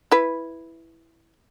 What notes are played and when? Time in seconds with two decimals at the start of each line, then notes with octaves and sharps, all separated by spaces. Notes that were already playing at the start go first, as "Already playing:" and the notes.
0.12 E4 B4